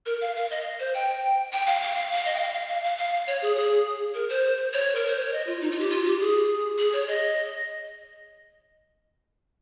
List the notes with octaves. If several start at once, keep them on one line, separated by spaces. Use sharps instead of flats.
A#4
F5
F5
D#5
C5
G5
G5
F5
F5
F5
F5
D#5
G5
F5
F5
F5
F5
F5
C#5
G#4
G#4
A#4
C5
C#5
A#4
C5
C#5
D#5
F4
D#4
F4
G4
F4
G4
G#4
G#4
C#5
D#5